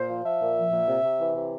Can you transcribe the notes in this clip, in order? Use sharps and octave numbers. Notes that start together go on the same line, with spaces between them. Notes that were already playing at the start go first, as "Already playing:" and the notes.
Already playing: A#2 C5
F3
F3 E5
A#2
F3
A#2
C3
C3
E3
C3